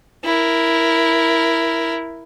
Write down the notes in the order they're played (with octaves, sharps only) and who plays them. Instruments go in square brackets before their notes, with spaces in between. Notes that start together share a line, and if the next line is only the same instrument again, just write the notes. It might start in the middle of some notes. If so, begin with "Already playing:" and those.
[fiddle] E4 A#4